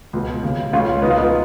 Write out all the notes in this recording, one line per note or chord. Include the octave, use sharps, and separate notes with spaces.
C#2 B2
D#2 C#3
C#2 B2 C#4 F4
C#2 B2 B3 D#4
F4
B3 D#4